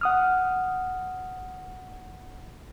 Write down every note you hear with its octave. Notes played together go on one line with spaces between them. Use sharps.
F#5 D#6 F6